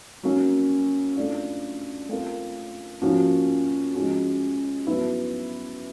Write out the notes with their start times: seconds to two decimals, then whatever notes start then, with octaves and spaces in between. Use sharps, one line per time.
0.23 F#3 A#3 C#4
1.16 A3 D4 F4
2.09 A3 C4 F4 A#4
3.02 F3 A#3 C#4 F#4
3.94 F3 G#3 C#4 F#4
4.87 F#3 B3 E4